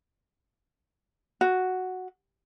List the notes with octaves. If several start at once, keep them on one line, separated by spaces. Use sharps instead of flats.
F#4